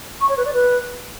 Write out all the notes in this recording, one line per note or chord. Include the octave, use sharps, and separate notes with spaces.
C#6
C#5
B4
D5
B4